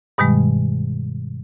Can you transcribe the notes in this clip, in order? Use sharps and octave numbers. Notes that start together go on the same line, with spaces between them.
G2 B2 D#3 G3 G#3